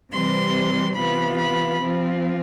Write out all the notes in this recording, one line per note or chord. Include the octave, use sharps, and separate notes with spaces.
C3 E3 G3 C4 C6
C3 E3 B3 F4 B5
B5
F3 C4 F4